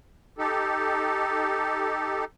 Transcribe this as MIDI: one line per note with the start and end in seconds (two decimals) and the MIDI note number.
0.38 2.25 63
0.38 2.25 67
0.38 2.25 69